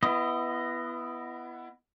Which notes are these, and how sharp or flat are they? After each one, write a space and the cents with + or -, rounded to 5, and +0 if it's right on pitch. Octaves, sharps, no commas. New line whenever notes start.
B3 +0 E4 +25 D#5 +0